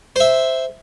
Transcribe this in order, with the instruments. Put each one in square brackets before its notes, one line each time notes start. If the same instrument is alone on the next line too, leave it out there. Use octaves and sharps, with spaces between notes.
[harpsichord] C5 E5